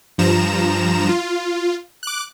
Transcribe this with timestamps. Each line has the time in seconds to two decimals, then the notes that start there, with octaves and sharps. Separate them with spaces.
0.18 G2 F3 A#5 E7
1.09 F4
2.03 D6 F#6